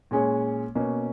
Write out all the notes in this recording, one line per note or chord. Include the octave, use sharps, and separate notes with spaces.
A#2 G#3 C#4 G#4 C#5
B2 A#3 C#4